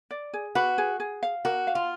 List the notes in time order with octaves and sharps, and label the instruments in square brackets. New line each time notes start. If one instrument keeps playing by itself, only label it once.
[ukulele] D5
G#4
[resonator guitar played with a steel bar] F#4 [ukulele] B4
[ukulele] G#4
G#4
F5
[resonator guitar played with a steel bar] F#4 [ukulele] A#4
[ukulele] F5
[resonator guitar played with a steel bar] F4